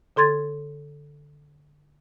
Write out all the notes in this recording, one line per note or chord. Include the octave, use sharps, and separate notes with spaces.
D3 A4 C6 G#6 A6